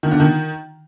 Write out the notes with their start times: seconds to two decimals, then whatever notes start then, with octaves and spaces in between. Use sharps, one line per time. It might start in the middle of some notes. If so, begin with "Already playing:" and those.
0.03 D#3
0.11 D3
0.20 D#3